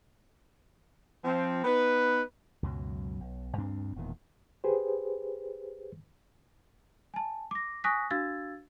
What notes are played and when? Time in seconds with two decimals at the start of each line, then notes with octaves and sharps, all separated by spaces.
1.25 F3 C4
1.64 B3 D#4 B4
2.63 C#2 F#2 B2 F#3
3.21 B1
3.57 D2 G2 C4 D4
3.96 E1 E2 A#2 D#3
4.64 G4 G#4 B4 C5
7.14 G#5 A5
7.51 D6 A#6
7.84 G#5 C#6 D#6 F#6 A#6 B6
8.11 D4 F#4 F5 E6 G#6 A6